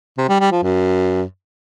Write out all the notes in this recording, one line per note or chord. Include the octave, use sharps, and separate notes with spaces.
C3
G3
G3
F3
F#2